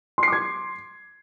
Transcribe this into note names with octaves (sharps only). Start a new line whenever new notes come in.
C6 D6 G#6 C7